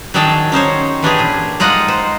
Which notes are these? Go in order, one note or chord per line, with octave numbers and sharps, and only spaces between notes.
D#3 F#3 D4 G#4 G5 A5
C#4 D#4 C5 C#5
E3 D4 G4 G#4
A#2
G#3 D#4 F4 D#5 F#5
C5